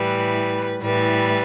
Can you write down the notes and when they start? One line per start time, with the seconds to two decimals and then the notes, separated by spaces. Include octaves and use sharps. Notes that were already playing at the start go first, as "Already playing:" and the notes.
Already playing: A2 E3 G3 B4
0.80 A2 E3 G3 B4